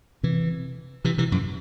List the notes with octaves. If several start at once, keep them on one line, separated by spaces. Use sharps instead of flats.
C3 E3
C3 E3
C3 E3
F#2